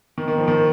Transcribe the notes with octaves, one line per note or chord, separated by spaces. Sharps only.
D#3
D#3
F3
D#3